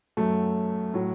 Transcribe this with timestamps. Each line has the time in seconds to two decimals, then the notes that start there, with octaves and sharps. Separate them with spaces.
0.17 F#2 F#3 A3
0.94 A2 F#3